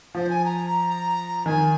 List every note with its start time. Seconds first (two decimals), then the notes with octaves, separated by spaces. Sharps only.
0.15 F3 C5
0.29 G#5
0.45 A#5
1.46 D#3 G#5